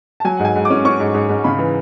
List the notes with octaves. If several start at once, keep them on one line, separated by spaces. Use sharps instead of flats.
A5
F#3 G#5
G#2 F#5
G#5
G#2
C#4 D6
C#4 C#6
G#2
G#2
G#2
C#3 B5
E3